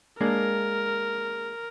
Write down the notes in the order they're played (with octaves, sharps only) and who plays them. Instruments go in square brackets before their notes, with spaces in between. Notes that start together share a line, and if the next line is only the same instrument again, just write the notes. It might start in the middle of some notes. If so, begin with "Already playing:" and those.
[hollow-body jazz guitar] G#3 A#3 D4 [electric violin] A#4